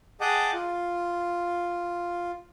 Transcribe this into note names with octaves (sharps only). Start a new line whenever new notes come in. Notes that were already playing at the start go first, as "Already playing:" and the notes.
G#4 D#5 F#5 G5 A5 D6
F4